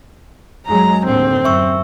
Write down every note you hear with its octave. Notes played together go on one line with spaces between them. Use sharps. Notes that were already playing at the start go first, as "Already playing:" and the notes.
F#2 F#3 G#3 A#5
D#2 A2 D3 C4
F#2 E5 C#6 E6